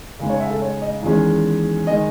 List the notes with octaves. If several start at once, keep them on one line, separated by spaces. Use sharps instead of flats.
C#3 G#3 D#4
C#5
E5
A4
C#5
D#5
E2 D#3 G#3 C#4
D#3 G#3 D#5